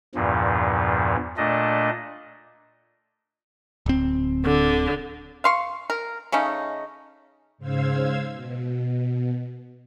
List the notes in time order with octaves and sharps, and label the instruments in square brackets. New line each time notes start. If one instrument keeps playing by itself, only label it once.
[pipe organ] E2 G2 A#2 F3
A#2 A3 D4 D#5
[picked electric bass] D1 C4
[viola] D3
[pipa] F5 C6 C#6
A#4
C#3 A3 C#4 D#4
[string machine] G#2 C#3 C5 F5 E6 G#6
B2